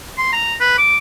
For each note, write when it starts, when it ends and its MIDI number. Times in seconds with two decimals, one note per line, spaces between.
0.17 0.32 84
0.32 0.55 82
0.60 0.75 71
0.78 0.97 86